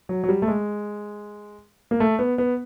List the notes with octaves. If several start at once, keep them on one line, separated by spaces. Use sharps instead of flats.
F#3
F#3
G3
A3
G#3
A#3
A3
B3
B3